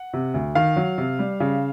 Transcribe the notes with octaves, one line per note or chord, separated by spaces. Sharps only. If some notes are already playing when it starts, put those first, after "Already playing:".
Already playing: F#5
C3
D2
D#3 F5
F#3
C3
G3
C#3